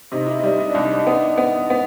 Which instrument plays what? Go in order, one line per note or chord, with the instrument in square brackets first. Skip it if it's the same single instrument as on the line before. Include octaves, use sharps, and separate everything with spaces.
[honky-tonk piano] C3 [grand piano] D#4
[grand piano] E4
[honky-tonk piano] G3 [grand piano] D#4
[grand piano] D#4
[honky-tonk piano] C2 [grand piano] D4
[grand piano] D#4
D#4
[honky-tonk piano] B3 [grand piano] D4
[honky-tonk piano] B3
B3